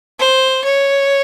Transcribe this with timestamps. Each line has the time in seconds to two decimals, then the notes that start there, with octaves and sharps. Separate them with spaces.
0.19 C5
0.64 C#5